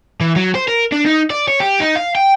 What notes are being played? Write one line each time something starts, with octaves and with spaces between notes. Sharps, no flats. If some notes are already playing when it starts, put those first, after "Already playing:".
E3
F#3
C5
A#4
D4
D#4
D5
C#5
G4
D#4
F5
G5